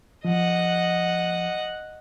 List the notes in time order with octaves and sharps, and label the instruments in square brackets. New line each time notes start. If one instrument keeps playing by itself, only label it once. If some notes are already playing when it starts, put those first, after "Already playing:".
[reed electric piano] F3 [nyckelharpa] D#5 F#5